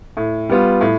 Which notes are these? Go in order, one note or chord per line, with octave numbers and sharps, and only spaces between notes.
A2
G3 B3 F4
A2